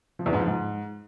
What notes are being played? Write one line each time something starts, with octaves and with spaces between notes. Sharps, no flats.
F3
E2
G#2
F3
G#2